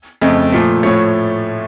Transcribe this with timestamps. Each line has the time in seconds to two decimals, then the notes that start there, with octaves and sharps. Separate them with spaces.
0.22 F2 C#3 A3 D#5
0.52 A#2 F3 A3
0.83 A2 F3 A3 C#5